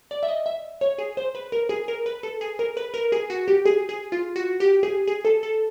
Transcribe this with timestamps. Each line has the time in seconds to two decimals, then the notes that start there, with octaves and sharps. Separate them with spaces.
0.11 D5
0.23 E5
0.28 D#5
0.46 E5
0.81 C#5
0.98 G#4
1.17 C5
1.35 B4
1.52 A#4
1.69 G#4
1.88 A#4
2.06 B4
2.23 A4
2.41 G#4
2.59 A#4
2.77 B4
2.94 A#4
3.12 G#4
3.30 F#4
3.48 G4
3.66 G#4
3.89 G#4
4.12 F4
4.36 F#4
4.60 G4
4.83 G#4
5.08 G#4
5.25 A4
5.43 A4